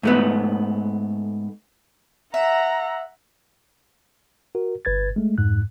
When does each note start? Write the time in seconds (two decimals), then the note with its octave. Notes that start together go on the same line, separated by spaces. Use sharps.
0.03 G#2 A3 B3
2.34 E5 F#5 A#5
4.55 F#4 A#4
4.85 G1 B4 G#6 A6
5.16 G#3 A3
5.38 F2 G#2 F#6